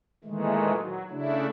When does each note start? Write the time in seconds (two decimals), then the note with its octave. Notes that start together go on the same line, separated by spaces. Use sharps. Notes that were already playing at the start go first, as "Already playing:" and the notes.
0.24 A#2 D#3 E3 G#3 A3
0.74 F#3
1.10 C#3 A3 D4 E4